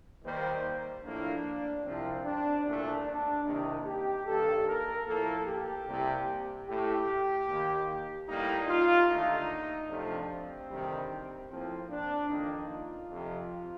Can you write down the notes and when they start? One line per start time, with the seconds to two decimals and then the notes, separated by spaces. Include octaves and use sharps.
0.24 D#2 D#3 G3 A#3 C5
1.04 A2 F3 A#3 D4
1.84 C2 C3 F3 C4
2.25 D4
2.64 C2 A#2 A3 D4
3.05 D4
3.45 C2 C3 D#3 A#3 D#4
3.85 G4
4.25 G2 D#3 A#3 A4
4.67 A#4
5.06 A2 F3 A#3 A4
5.46 G4
5.86 C2 C3 G3 A#3
6.67 A2 A3 G4
7.47 D#2 D#3 A#3
8.28 A2 G3 A#3 D#4
8.67 F4
9.09 D#2 D3 A3 D#4
9.88 F2 C3 F3 A3 D4
10.29 C4
10.69 D2 C3 D#3 G3
11.49 A2 F3 A#3 C4
11.89 D4
12.29 F2 D#3 A#3 D#4
12.70 F4
13.10 F2 C3 F3